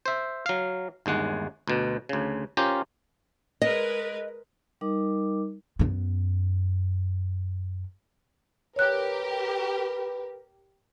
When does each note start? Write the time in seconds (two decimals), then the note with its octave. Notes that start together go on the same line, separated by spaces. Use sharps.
0.06 C5 E5
0.46 F#3 F5
1.06 G1 D#2 G#3 F#5
1.68 D2 B2
2.09 D2 C#3
2.57 C#4 F4 G4 A#4 C5
3.62 G#3 A#4 B4 D#5
4.81 G3 D#4 A#4 D#5 D6
5.79 F#2 B3
8.76 G4 A#4 B4 C#5 F#6